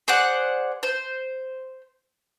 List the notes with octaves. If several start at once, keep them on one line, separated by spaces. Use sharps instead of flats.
G#4 C5 D5 F#5
C5